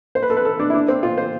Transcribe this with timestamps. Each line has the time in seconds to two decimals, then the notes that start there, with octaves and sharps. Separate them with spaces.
0.15 C5
0.23 B4
0.30 A4
0.37 B4
0.45 A4
0.59 D4
0.70 E4
0.74 D4
0.88 C4
1.03 F4
1.18 C5